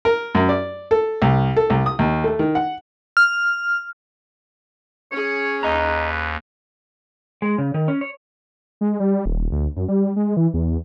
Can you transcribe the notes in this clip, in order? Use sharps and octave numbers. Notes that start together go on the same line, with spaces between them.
A#4
F#2
D5
A4
C2
A4
C2
D#6
D#2
A3
D#3
F#5
F6
C#4 G#4 C#5
D#2 B4 D#5 A#5
G#3
C#3
D#3
C#4
C#5
G#3
G3
D#1
D2
F#2
G3
G#3
E3
E2